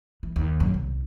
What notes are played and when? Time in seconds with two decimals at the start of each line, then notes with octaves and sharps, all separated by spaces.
0.23 E3
0.36 D#2
0.60 A#1 F#2
0.74 C2